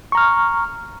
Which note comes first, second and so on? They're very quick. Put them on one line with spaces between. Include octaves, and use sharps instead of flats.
C#6 A#5 F6